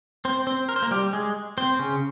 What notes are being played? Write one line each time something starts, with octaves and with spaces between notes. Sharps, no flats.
C4 C5
C4 C5
A#4
C5
A#3 A#4
G3 G4
G#3 G#4
C4 C5
C#3 C#4